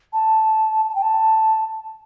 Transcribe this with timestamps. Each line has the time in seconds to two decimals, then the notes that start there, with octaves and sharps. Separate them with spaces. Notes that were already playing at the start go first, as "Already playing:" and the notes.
0.13 A5
0.89 A5
0.95 G5
1.02 A5